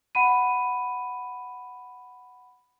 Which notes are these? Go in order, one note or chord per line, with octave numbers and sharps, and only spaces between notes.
F#5 B5 D#7